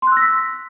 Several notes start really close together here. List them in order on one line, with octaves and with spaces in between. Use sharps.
C6 F#6 E6 A#6 B6